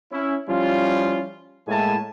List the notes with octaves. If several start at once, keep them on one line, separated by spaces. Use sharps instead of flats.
C#4 E4
F3 G3 C#4 E4 F4
A2 G#3 A#3 E4 G#5 A5